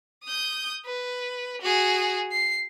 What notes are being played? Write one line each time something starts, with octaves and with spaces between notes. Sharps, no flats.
D#6 G6
B4
F#4 G#4
C7